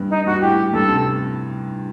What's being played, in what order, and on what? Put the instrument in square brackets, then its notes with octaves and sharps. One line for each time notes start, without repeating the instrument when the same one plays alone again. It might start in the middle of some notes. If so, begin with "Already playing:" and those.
Already playing: [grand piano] G2
[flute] D#4
[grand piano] G2 [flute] F#4
[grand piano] A2 [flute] G4
[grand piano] G2 [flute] A4
[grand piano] C3